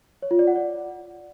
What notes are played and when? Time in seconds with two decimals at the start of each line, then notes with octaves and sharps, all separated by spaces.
0.22 C#5
0.31 F4
0.39 D5
0.47 F#5
0.56 D5